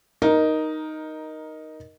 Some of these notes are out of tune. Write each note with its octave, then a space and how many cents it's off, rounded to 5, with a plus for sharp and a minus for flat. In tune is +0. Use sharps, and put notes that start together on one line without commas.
D#4 +0 A#4 +10